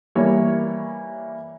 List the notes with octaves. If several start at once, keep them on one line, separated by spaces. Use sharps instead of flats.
E3 G3 A#3 C#5